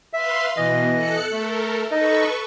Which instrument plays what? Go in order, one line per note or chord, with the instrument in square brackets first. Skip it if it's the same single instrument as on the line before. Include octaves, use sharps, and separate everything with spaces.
[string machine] B4 F5 C6 [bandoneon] E5
[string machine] B2 [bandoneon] E3 D#5
[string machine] A4 F#6 C#7
[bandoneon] A3 [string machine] A4 A#4
[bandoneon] D#4 D#5 [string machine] A4 B4 C#6